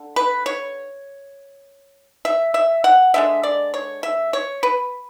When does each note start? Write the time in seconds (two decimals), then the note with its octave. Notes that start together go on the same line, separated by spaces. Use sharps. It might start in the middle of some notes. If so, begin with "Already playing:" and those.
Already playing: D3
0.16 B4
0.46 C#5
2.25 E5
2.54 E5
2.84 F#5
3.14 D3 G#3 D4 E5
3.43 D5
3.74 C#5
4.03 E5
4.33 C#5
4.63 B4